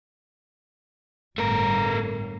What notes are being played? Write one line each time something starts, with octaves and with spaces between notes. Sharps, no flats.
G1 A2 A3 A#4